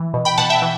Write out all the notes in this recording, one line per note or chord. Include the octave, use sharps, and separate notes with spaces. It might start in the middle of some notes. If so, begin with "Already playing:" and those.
Already playing: E3
B2
G5 B5
B2 F#5 A5
E5 G5
E3